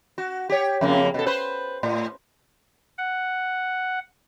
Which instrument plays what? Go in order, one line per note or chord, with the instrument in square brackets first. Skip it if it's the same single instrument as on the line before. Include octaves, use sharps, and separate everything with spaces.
[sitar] F#4
G4 C#5
F2 C#3 A#3
B2 A4
B4 C5
A2
[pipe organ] F#5